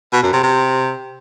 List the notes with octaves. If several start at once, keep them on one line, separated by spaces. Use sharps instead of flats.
B2
F#2
C3
C3